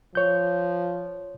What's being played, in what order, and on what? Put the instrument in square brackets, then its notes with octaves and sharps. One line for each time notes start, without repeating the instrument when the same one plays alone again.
[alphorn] F3 [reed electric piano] C#5 G6